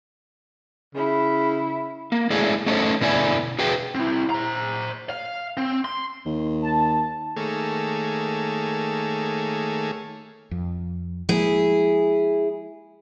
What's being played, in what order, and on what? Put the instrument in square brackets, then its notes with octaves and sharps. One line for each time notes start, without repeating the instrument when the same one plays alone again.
[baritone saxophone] C#3 [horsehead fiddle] E4
[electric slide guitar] A#3
G#3 A3 C#4 D4 E4 G#4
A3 C#4 D#4 A4 C5 C#5
B2 D3 E4 D5 G#5
F#4 G#4 B4 G5
[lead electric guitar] C4 E4
C5 A#5
F5
C4
C6
[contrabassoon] D#2
[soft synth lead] A5
[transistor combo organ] D#3 A3 A#3 G#4 A4 C#5
[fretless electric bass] F2
[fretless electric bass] F3 G#3 A#3 [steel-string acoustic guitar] E4 G#4